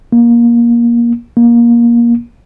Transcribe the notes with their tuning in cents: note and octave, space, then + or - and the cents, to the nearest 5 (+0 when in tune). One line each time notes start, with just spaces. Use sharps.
A#3 +20
A#3 +20